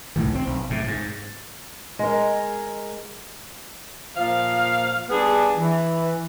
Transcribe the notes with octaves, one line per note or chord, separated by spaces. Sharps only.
C2 A2 D#3
C4
B1
A2 C3
G#2
G#3 A#4
A#2 F3 F5
G3 B3 D4 G#4
E3